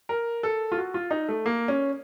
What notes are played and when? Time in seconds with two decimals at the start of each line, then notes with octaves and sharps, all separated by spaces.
0.09 A#4
0.43 A4
0.72 F4
0.77 F#4
0.94 F4
1.11 D#4
1.28 A3
1.46 A#3
1.68 C#4